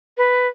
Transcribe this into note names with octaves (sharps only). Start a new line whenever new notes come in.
B4